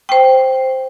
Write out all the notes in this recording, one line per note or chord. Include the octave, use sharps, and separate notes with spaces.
C5 G5